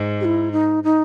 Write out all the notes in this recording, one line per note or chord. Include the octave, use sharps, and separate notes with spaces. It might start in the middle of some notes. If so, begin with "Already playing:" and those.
Already playing: G#2
G4
E4
D#4
D#4